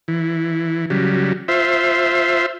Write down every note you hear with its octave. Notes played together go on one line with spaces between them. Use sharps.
E3
C#3 F#3 G3
F4 C5 E5